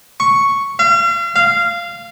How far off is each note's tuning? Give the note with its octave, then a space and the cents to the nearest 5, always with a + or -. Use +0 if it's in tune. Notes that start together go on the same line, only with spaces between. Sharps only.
C#6 +0
F5 -40
F5 -15